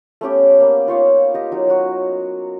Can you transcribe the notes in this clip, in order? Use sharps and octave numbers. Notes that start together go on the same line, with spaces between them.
A3 B3 C#4 G4
A#3 B3
D#4 F4 C#5 F5
G4 D#5
F#3 D#4
F#3 F#4